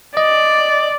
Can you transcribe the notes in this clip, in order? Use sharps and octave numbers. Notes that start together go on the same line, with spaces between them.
D5 D#5